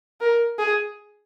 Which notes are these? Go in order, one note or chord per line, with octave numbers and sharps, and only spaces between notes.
A#4
G#4